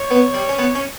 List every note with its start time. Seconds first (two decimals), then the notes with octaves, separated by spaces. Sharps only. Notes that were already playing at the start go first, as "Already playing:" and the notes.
Already playing: C#5
0.11 B3
0.34 G3
0.49 C#4
0.58 B3
0.75 C#4